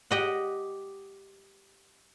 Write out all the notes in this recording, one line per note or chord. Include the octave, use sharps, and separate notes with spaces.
G4 D#5 F#5